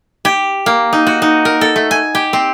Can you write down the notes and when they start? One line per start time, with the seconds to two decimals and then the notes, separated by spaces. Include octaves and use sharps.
0.25 G4
0.66 A#3
0.93 D#4
1.07 F#4
1.22 D#4
1.45 A#4
1.61 A4
1.76 A3
1.91 G#5
2.15 G4
2.33 C4